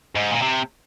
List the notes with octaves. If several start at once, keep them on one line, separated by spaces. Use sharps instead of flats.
G#2
A#2
C3